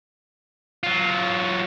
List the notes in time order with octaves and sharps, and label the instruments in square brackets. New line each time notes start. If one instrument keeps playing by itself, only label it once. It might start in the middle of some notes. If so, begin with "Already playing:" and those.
[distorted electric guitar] F#3 F4